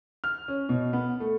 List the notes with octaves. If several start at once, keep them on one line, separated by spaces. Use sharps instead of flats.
F6
C#4
B2
B3
A3